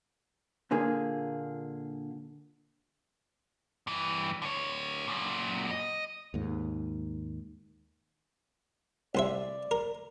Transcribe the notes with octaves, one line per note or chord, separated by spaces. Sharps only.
A#2 D3 A#3 G#4
G2 E3
D3 C#5
F#2 A#2
D#5
D#2 G#2
C2 C5 D5 E5
A#4